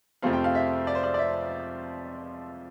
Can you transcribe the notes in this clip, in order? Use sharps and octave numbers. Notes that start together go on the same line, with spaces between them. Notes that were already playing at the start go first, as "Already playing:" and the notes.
F2 C3 F3 A3 C4 F5
G5
F5
E5
D5
C5
D5
D5
E5